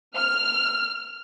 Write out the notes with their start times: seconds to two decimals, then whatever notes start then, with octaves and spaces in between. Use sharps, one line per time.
0.15 F6